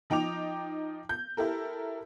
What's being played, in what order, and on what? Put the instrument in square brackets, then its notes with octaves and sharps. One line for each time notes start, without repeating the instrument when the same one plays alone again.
[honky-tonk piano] F3 D#4 G5 D6 F7
G6
E4 G4 A4 A#4